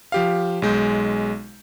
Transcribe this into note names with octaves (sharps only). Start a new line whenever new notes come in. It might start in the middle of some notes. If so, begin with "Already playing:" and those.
F3 G4 F5
B1 G#3 G6